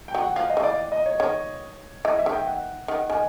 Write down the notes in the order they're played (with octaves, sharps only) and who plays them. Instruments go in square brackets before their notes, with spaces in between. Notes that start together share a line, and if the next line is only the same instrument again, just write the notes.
[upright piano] G5
[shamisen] F#3
[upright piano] F#5
[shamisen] F3 [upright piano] F5
[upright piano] D#5
[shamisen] E3
[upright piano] D5
D#5
C#5
[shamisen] D#3 [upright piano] C#5
[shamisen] E3 [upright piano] D#5
[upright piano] E5
[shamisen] D#3
[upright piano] G5
F#5
[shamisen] D#3 [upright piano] F#5
[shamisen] D#3 [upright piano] G#5